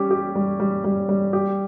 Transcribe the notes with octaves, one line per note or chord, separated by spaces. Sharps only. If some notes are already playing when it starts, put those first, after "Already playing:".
Already playing: G3 C#4 G4
G4
G3
G3
G3
G3
G4